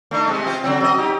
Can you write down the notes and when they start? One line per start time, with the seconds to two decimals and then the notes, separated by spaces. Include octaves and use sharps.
0.11 A3 D4 D#4
0.28 C3 G#3
0.47 C4 F4 C5
0.64 C#3 F#3 C4
0.80 F#3 D#5
0.98 D#4 G4